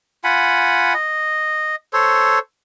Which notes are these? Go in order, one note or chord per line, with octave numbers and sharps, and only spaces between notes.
F4 F#5 G#5 B5
D#5
A4 C5 C#5